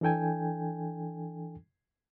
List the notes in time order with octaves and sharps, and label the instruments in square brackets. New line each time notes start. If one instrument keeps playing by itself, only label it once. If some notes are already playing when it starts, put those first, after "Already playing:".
[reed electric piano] E3 D4 A4 G5 G#5